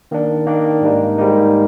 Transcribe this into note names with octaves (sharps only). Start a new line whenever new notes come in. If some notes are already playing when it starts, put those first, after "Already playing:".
D#3 A#3 D4
D#3 A#3 D4
G#2 G3 A#3 D#4
G#2 G3 A#3 D#4